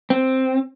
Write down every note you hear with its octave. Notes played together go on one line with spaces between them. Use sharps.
C4